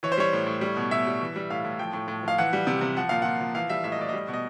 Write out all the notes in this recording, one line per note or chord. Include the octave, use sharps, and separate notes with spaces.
E3 C#5
C5
G3 C#5
A2
A2
G3
B2
B2 E5
G3
E3
G3
A2 F5
A2
F3 G5
A2
A2
F3 F5
E3 F#5
G3
C3
C3
F3 F#5
A#2 F5
A#2 F#5
F3
E3 F5
G3 E5
A2 E5
D#5
A2 D5
G3 D#5
B2
D#5